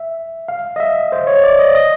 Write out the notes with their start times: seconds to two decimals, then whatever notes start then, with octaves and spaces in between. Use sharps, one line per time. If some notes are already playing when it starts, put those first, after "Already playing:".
Already playing: E5
0.48 F5
0.76 D#5
0.80 E5
1.12 C5
1.27 C#5
1.44 D5
1.59 D#5
1.75 D#5